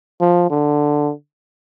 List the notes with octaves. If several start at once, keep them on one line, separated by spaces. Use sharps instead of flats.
F3
D3